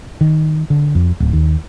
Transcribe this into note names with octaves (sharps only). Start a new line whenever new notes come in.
D#3
D3
F2
D1
D#2